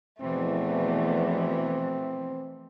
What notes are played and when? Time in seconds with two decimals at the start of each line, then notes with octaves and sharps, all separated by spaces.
0.21 E2 B2 E3 F3 A3 C4